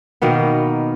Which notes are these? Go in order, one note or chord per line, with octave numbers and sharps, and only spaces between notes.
B2 D#3 A#3 B3